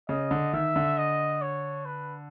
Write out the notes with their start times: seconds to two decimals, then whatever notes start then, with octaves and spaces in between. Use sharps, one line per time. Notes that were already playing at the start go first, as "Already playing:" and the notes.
0.09 C#3 D#5
0.31 D3
0.53 D#3 E5
0.76 D3
0.97 D#5
1.42 C#5
1.86 B4